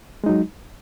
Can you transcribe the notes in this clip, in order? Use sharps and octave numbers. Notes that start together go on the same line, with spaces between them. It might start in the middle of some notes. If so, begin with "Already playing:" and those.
F#3 G#3 D#4